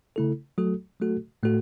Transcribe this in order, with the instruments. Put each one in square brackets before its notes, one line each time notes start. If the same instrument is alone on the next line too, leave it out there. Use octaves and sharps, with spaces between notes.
[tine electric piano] C#3 A3 E4 A4
F#3 A3 F#4 A4
F#3 A3 F#4 A4
A2 A3 F#4 A4